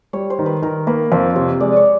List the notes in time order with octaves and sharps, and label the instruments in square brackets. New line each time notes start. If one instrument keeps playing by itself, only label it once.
[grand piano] G3 [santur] C#5
[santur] C5
[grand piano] D#3
[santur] B4
[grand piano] D#3 [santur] A#4
[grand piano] A#3 [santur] B4
[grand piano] F2 [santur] C5
[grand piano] C3 [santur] C#5
[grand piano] G#3 [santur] D5
[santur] C#5